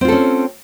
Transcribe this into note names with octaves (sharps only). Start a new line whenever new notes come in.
C4 C#4 F4 A4